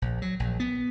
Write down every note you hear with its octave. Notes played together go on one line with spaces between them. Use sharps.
A#1
F#3
A#1
B3